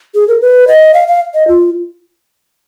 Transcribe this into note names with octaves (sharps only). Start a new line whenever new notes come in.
G#4
A#4
B4
D#5
F5
F5
D#5
F4